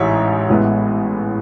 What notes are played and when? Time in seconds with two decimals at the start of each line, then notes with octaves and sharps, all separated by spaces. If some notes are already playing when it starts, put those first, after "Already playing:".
Already playing: A1 G#2 E3 C#5 E5
0.50 A1 A2 G#3 B3 E4